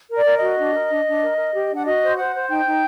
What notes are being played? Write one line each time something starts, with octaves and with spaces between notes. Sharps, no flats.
A#4
D5
A#4
F#4 D#5
D4
A#4
D4
D4
A#4
A#4
G4
D4 F#5
F#4 D#5
C5
C5 F#5
C5
D#4 G5
D#4